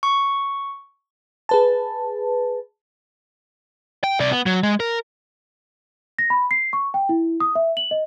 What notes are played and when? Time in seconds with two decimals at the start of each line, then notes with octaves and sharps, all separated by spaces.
0.03 C#6
1.49 G#4 B4 A5
4.04 G5
4.20 C3 D5
4.32 B3
4.46 F#3
4.63 G#3
4.80 A#4
6.19 A#6
6.30 B5
6.51 C7
6.73 C#6
6.94 G5
7.09 E4
7.40 D#6
7.55 E5
7.77 F#7
7.91 D#5